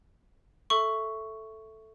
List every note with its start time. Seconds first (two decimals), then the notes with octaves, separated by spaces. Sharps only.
0.70 A4 E5 C#6